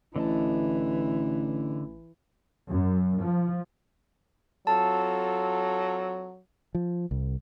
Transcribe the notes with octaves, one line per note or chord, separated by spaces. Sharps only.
A1 D3 E3 D#5 A5
F#2
F3
F#3 C4 F4 A4 A5
F3
C2